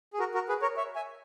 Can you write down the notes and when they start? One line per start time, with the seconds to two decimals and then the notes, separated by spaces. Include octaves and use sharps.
0.13 G#4
0.19 F#4 A#4
0.34 F#4 A#4
0.49 G#4 B4
0.62 A#4 C#5
0.77 C#5 E5
0.95 E5 G#5